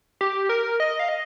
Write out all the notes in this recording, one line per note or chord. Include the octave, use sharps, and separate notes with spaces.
G4
A#4
D#5
F5
D#5